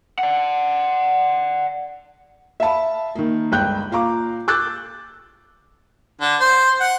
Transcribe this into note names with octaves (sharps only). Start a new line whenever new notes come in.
D5 F#5
E5 F5 A5 B5
D#3 A#3
G1 C#2 G5 F#6 G6
A#2 F5 A#5 D6
D6 E6 F#6 G6 A6
D3
C5
F#5